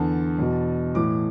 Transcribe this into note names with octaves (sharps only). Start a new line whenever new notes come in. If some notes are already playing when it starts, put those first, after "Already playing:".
Already playing: E2 D3 A5
E2 B2
A2 E3 D6